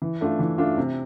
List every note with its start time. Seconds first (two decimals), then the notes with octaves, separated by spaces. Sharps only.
0.02 E3
0.21 A3 D4 F4
0.39 E3
0.58 A3 D4 F4
0.78 C3